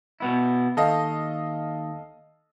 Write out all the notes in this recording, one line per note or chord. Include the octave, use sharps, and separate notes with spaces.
B2 B3 E4
D#2 A4 D#5 F5